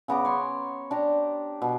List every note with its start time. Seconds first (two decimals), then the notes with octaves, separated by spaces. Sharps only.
0.08 C#3 B3 A#5 D6
0.25 C#5 C6
0.91 D4 G4 A#5
1.62 B2